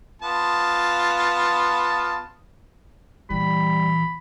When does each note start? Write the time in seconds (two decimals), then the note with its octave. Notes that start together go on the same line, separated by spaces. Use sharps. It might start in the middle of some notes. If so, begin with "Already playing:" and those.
0.22 B3 F4 A5
3.30 A#2 E3 G3 B5